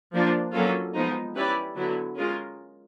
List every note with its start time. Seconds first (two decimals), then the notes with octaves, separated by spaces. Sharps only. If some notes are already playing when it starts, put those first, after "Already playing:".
0.13 F3 A#3 D4 F4
0.54 F#3 A#3 C#4 F4 A4
0.94 F3 G#3 B3 D#4
1.35 C#4 E4 G4 B4 D5
1.76 D3 F#3 B3 E4
2.17 G#3 C#4 F4 A#4